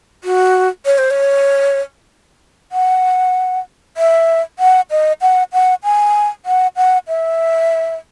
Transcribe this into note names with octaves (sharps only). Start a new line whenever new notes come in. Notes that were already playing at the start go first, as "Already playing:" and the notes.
F#4
C#5
C5
C#5
F#5
E5
F#5
D#5
F#5
F#5
G#5
F#5
F#5
E5